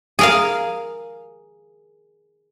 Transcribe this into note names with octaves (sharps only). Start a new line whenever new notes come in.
G#4 A#4 F5